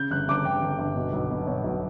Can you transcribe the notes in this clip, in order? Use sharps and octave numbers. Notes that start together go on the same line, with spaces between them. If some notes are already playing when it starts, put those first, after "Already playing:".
Already playing: C#3 G6
G1 F#6
G1 D6
G1 G5
G1
G1
B2
B1
B2
B2 C#5
B1